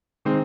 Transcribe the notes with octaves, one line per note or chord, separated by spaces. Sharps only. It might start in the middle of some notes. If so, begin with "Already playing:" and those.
D#3 G#3 C4